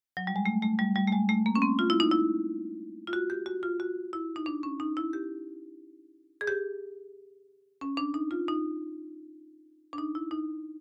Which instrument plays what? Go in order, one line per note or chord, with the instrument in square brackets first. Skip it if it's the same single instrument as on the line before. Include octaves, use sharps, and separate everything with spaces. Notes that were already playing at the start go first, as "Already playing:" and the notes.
[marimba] F#3
G3
G#3
A3
A3
G3
G3
A3
G#3
A3
A#3
C#4
C4
F4
E4
D#4
E4
F4
F#4
G4
F#4
F4
F#4
E4
D#4
D4
C#4
D#4
E4
G4
G#4
G4
C#4
D4
D#4
F4
D#4
D4
D#4
E4
D#4